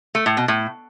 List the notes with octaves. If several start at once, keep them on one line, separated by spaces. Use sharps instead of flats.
A3
A2
B2
A2